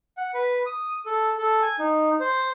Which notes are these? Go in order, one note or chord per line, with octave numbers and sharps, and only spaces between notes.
F#5
B4
D#6
A4
A4
G#5
D#4
C5